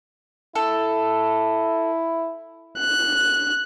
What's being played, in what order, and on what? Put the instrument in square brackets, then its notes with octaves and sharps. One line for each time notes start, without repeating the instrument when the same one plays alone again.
[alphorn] E4 [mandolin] A4
[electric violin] F#6